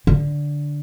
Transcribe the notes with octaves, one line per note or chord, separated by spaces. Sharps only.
D3